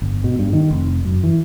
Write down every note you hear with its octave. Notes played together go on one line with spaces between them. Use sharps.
G1
B2
G2
D#3
F1
F#2
E3